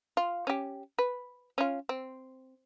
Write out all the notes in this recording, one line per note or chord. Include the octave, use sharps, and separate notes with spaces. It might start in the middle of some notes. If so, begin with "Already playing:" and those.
F4
C#4 G4
B4
C#4 F4
C4